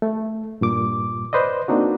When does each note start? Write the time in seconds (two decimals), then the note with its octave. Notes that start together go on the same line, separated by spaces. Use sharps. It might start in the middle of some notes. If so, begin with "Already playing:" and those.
0.02 A3
0.61 G2 A#2 D6
1.33 B4 C5 D5 D#5
1.68 A#3 C4 D4 D#4 F#4